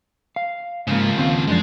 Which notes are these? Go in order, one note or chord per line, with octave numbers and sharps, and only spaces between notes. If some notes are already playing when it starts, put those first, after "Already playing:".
F5
G#2 C#3 F3 A#3
D#2 C4 F5
F#2 F3 G#3 D4